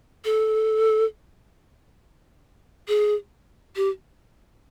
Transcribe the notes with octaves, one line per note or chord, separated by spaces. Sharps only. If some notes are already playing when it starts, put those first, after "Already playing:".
A4
G#4
G4